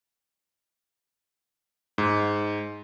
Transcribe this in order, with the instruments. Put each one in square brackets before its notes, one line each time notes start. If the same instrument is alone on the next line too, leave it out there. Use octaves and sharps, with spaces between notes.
[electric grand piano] G#2